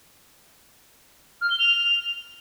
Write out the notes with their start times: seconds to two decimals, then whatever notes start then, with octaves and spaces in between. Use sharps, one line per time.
1.41 F6
1.50 G7
1.59 F7